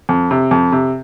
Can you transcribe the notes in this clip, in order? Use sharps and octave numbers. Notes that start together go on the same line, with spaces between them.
F2
C3
F2
C3